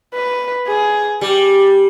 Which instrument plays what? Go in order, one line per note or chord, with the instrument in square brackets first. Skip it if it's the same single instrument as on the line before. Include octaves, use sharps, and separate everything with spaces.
[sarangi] B4
G#4
[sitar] G3 [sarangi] G4